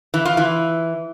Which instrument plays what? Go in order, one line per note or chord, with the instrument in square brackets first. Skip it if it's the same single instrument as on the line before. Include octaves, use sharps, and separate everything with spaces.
[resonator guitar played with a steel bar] E3
F4
E3